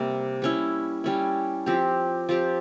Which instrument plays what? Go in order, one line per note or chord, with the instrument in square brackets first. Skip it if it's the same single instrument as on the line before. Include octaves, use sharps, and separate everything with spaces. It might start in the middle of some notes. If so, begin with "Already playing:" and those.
Already playing: [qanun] C3 G3 A#3
G3 C#4 E4
G3 C#4 E4
F3 C4 G4
F3 C4 G4